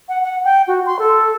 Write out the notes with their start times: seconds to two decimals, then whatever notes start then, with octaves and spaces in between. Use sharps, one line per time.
0.09 F#5
0.24 F#5
0.45 G5
0.68 F#4
0.86 C6
0.99 A4